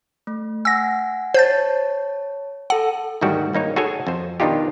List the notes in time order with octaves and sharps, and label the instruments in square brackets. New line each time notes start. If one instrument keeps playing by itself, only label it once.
[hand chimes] A3
[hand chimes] F#5 G#5 [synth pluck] E6 A#6
[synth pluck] C5 G6 A6 [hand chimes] C#5 A5
[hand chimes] A4 A5 E6 [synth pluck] F#5
[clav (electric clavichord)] D2 G#2 D#3 G3 F#4 G4
G#1 A#3 D#4 C#5
F#4 G#4 A4 C#5 G#5
F2 C5
B2 D#3 D4 D#4 F4 G4